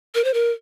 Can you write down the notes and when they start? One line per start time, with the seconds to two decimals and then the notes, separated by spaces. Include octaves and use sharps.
0.15 A#4
0.24 C5
0.34 A#4